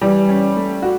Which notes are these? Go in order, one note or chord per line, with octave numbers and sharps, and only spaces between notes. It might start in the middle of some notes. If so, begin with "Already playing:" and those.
E3 G3
C#4
A3
F#4